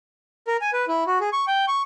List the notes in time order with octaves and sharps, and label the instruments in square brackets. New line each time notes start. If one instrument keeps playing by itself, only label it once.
[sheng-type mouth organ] A#4
G#5
B4
E4
F#4
G#4
C#6
G5
C#6